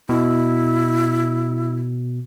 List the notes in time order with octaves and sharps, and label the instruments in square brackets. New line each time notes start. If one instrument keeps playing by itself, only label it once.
[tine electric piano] B2 [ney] E4